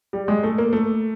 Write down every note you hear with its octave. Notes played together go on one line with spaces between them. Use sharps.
G3
G#3
A3
A#3
A3